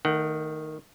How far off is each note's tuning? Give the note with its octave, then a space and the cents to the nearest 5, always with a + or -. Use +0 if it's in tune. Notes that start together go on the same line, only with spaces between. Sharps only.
D#3 +0 A3 +35 F#5 +30